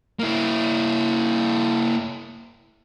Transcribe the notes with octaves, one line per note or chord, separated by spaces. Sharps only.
A#3 E4